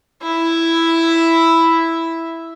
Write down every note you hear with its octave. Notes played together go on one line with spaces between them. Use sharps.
E4 E5